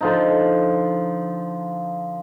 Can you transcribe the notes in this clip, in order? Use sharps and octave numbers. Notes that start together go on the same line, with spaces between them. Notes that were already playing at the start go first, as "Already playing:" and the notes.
D3 F3 D#4